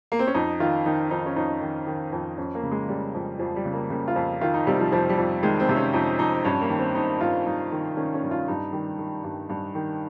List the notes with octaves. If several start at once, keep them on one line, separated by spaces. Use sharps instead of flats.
A#3
C4
C#4
F2 D#4
D#3 F4
D#3 D#4
F2 D#4
C#4
F2 D#4
D#3
D#3
F2
F2 C#4
A#3
C#3
G#3
C#3 G3
F2
F2 F3
G3
C#3
A#3
C#3 A#3
F4
F2
D#3 F4
D#4
C3 G3
F3
F2 F3
G3
F2
D#3 G#3
C4
C3
C#4
F2 D#4
F2 D#4
G2 C#4
A#3
D#3
C4
D#3 D#4
G2 F4
G2 D#4
D#3
D#3 C#4
C#4
G2
F4
G2 D#4
D#3 G3
D#3
G2
G2
D#3